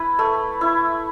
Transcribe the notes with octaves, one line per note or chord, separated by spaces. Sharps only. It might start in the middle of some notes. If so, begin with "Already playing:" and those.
Already playing: E4 B4
A3
E4